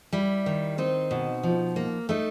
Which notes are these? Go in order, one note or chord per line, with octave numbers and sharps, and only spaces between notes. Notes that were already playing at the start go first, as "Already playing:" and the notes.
G3 E4
D#3
C4 D#4
B2
F3
A#3
A3 D#4